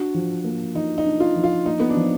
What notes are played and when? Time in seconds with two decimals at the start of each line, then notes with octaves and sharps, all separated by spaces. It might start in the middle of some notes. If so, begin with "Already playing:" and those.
Already playing: D4 F#4
0.14 F3
0.44 A#3
0.75 F3 D#4
0.98 D#4
1.05 D4
1.20 F4
1.35 F3
1.43 F4
1.65 A#3 D#4
1.80 B3
1.89 D4
1.97 F3